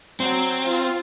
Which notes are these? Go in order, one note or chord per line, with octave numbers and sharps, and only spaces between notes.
F#3 C4
F4